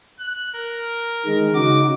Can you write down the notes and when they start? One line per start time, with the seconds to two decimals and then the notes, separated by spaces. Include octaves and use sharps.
0.20 F#6
0.55 A#4
1.26 D#3 G#3
1.55 C#3 D#4 F#4 D6